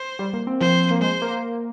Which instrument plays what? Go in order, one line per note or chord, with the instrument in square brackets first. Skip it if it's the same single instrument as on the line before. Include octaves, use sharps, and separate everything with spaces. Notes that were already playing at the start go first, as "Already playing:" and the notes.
Already playing: [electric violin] C5
[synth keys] G3
A#3
C4
[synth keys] F3 [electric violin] C5
[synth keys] A#3
[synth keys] G#3 [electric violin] C5
[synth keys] A#3